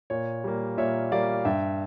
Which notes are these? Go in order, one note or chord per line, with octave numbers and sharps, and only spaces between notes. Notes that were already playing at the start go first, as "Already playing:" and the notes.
A#2 C#5
G3 A#3
A#2 C#5 E5
G3 A#3 D5 F5
G2 E5 G5